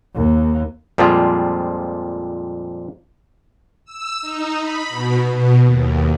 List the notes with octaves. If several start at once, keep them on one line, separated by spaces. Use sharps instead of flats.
D#2
F2 A#2 F3 G3 G#3 F4
E6
D#4
B5
B2
B2
D#2